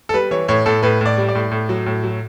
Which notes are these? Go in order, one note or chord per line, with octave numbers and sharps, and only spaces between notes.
A4
G3 B4
E3 C#5
A2 C#5
A2 A4
A2 B4
A2 D5
G3
D5
A2
A2
F#3
A2
F#3